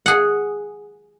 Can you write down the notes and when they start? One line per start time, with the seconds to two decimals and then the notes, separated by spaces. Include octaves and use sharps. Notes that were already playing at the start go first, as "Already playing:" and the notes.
0.06 G#4 F#5